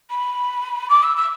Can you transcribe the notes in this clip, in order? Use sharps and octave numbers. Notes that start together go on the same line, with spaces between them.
B5
D6
E6
E6